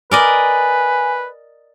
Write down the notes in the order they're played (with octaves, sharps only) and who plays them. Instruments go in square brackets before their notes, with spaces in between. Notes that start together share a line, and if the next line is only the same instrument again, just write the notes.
[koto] A#4 D5 D#5 [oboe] B4 [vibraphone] G#5